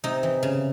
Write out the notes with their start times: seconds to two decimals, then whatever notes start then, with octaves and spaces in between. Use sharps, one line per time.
0.04 C3 D#4
0.23 E3
0.43 C#3